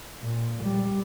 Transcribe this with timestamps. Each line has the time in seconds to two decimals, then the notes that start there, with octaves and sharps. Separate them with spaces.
0.21 A#2
0.63 G3